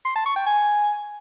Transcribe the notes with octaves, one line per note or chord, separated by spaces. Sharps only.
C6
A5
C#6
G5
G#5